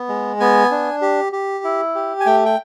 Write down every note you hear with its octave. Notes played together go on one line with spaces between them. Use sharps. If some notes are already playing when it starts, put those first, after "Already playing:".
Already playing: B3
G#3
B3 G#5
D4
G4
G4
E4
G4
G#5
A3 G5
G5